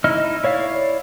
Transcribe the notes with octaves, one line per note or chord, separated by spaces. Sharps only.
D#4 E4 D#5 F6
E4 C#5 D5 F5